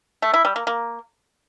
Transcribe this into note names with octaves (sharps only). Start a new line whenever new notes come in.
A3
E4
G3
A#3
A#3